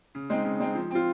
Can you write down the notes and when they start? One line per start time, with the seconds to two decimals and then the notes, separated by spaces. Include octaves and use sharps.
0.15 C#3
0.30 G#3 C4 D#4
0.45 C#3
0.60 G#3 C4 D#4
0.75 F3
0.91 C4 F4